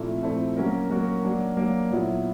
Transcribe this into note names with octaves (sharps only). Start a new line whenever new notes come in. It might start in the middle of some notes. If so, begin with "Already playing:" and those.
Already playing: A#2 F3 A3 C4 E4
A#2 F3 A3 C4 E4
F#3 A#3 C#4 F#4 A#4
F#3 A#3 C#4 F#4 A#4
F#3 A#3 D4
F#3 A#3 D4
A#2 F#3 B3 E4